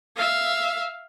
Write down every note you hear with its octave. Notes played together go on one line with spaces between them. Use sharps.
E5 F5